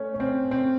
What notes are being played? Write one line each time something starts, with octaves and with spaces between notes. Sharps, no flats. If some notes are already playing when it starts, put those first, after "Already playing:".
Already playing: A3 C#4
C#4
C4
C4